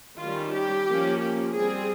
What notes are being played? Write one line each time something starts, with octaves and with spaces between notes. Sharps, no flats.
D#3 G3 C#4 F4
G4
F3 A#3 C#4
G4
G3 C4 G#4